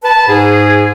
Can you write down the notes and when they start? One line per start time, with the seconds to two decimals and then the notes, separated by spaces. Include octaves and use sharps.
0.02 B4 A5
0.27 G#2 G#4